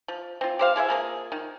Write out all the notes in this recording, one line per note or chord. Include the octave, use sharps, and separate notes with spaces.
F3
C4 F4
G4 C5 F5
E3 G#4 C5 E5
F3 A#3 G#4
D#3